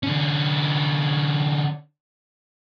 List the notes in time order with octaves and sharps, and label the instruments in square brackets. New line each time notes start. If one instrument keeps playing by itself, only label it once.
[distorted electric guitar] D3 C#4